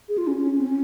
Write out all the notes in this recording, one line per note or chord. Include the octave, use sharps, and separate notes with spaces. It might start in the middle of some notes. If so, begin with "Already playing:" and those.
G#4
F4
C#4
C#4
C4
C#4